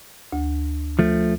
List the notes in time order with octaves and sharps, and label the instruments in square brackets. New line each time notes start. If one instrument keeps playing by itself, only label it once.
[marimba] D2
[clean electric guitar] F3 A3